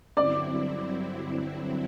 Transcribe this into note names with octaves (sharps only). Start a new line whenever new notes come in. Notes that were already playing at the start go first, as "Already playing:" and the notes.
G2 D3 F#3 C4 E4 D5 D6